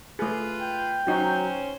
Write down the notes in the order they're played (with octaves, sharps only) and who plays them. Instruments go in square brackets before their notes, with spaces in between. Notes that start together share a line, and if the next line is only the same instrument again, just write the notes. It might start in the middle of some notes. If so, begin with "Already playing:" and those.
[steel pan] A3 G#4 [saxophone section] F4 B4
[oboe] G5
[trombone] F#3 [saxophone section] C#4 C5 [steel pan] D#4 F#4